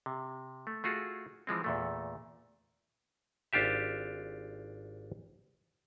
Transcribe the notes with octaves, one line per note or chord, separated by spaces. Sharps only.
C3
A3
A3 F4 F#4 G#4
E3 F3 G#3 C4
E2 A#2 A3
G#1 D4 F4 G4 E5